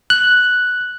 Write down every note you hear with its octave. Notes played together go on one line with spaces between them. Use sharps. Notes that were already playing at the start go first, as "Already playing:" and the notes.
F#6